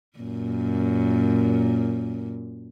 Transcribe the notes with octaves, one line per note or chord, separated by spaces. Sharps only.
F#2 A#2